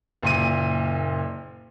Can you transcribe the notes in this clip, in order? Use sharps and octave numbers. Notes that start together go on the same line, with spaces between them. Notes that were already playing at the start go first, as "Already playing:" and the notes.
F#1 A#2 D#7